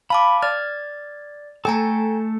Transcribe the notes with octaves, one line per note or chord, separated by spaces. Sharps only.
F5 A5 B5 D6
D5 F6 A6
A3 A4 G5 G#5 A#5